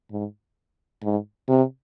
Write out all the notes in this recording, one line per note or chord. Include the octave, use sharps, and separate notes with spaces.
G#2
G#2
C3